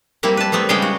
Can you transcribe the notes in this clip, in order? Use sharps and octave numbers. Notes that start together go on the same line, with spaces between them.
G3 A#3 C4 E4
B4 A5
G3 A3 B3 C4
C#3 G3 G#3 G#4 F5 G5
F#4